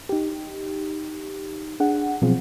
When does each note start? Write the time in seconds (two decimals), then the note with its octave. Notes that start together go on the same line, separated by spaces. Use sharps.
0.09 D#4 G4
1.80 D4 G#4 F#5
2.22 B2 F3 F#3 C4 F4 G#4